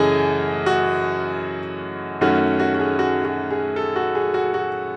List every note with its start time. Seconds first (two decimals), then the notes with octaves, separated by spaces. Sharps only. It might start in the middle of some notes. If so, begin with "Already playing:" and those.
Already playing: F#2 C#3 E3 A3 G#4 D#5
0.66 F#4
2.21 F#2 D#3 A3 C#4 F#4
2.60 F#4
2.74 F#4
2.79 G#4
2.99 F#4
3.25 F#4
3.51 G#4
3.76 A4
3.96 F#4
4.15 G#4
4.34 F#4
4.54 F#4